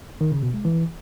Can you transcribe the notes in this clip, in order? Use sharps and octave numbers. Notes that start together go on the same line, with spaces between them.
D#3
C#3
B2
G#3
E3